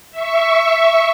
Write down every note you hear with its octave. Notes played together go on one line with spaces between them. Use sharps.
E5 C#6